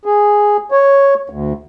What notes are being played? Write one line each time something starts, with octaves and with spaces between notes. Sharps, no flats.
G#4
C#5
D2